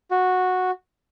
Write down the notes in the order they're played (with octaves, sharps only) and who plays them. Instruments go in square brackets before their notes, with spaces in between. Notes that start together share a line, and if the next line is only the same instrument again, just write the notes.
[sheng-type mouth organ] F#4